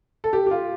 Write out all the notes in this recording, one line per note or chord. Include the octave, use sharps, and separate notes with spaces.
A4
G4
G4
F4